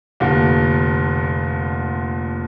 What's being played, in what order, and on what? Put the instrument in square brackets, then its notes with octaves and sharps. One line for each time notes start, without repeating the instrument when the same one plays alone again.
[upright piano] F1 A#2 D3